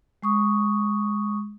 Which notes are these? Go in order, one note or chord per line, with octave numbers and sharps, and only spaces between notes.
G#3 C#6 D#6